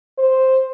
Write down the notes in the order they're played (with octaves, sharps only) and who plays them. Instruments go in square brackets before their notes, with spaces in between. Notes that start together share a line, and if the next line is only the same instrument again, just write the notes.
[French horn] C5